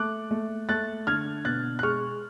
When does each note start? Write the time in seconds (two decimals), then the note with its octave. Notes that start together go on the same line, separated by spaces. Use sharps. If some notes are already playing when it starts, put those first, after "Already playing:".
Already playing: A3 D6 F#6
0.31 A3
0.69 A3 F#6 A6
1.07 D3 F6 G#6
1.45 B2 F#6 A6
1.79 F#6
1.83 G#3 C#6 F6